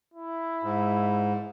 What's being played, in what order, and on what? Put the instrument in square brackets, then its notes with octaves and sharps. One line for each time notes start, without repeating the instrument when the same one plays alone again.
[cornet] E4
[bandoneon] G#2